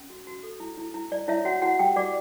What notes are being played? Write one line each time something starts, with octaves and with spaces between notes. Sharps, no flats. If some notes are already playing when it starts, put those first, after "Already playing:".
Already playing: C#4
F#4
F#4
A4
E4
E4
E4
E4 D5
E4 C#5 E5
F#4 C#5 F#5
E4 F#4 F#5
F#4 G4 G5
F#4 D5 D6